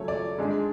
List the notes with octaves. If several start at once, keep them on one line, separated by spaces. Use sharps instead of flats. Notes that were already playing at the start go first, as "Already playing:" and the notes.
Already playing: C#3 F#3 A3 C#4 C#5
D5
G#2 G#3 D4